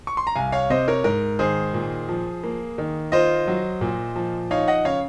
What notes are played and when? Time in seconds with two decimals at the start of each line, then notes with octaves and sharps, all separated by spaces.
0.07 C#6
0.17 C6
0.27 A#5
0.36 C2 F5 G#5
0.52 C#5 F5
0.70 C3 C5 D#5
0.88 A#4 C#5
1.04 G#2 A#4
1.39 D#3 G#4 C5
1.74 A#2
2.09 F3
2.44 A#3
2.78 D#3
3.12 F4 C5 D#5
3.47 F#3
3.81 A#2
4.16 F3
4.51 D#4 C#5 F5
4.68 D#5 F#5
4.85 C#3 C#5 F5